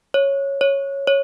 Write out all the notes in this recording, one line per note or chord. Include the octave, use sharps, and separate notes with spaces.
C#5
C#5
C#5